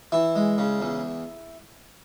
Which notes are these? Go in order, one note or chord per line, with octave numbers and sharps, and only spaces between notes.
E3 E4
G#3
C#3
E2